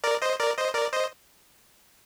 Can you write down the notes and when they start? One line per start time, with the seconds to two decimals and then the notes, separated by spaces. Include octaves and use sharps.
0.04 A#4 D5
0.22 C5 D#5
0.39 A#4 D5
0.57 C5 D#5
0.74 A#4 D5
0.93 C5 D#5